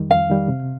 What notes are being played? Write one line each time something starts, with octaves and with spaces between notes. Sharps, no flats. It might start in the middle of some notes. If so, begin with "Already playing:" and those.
Already playing: F2 D#3 G3
F2 F5
D#3 G3
C3